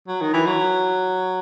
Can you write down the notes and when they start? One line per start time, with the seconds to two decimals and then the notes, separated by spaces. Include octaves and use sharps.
0.08 F#3
0.21 D#3
0.34 E3
0.47 F#3